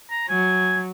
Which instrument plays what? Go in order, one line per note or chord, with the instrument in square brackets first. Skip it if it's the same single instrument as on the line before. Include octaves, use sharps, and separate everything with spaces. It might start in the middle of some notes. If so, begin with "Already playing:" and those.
[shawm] A#5
[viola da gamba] F#3 [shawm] G#5